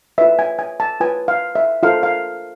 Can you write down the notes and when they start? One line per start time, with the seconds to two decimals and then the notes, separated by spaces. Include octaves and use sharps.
0.18 B4 E5
0.21 F4
0.39 G#5
0.59 G#5
0.80 A5
1.00 F4 B4 G#5
1.28 F5
1.55 E5
1.83 F4 A4 C5 F5
2.03 F5